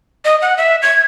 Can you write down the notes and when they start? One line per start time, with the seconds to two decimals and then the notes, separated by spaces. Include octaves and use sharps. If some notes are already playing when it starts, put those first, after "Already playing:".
0.25 D#5
0.42 F#5
0.58 E5
0.82 G#6